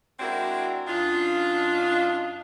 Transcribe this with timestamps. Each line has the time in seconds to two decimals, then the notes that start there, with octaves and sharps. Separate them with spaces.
0.20 G#3 C4 D4 E4 F#4 A#4
0.87 F#2 D4 D#4 F4